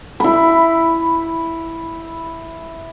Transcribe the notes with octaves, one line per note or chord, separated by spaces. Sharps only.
E4 B5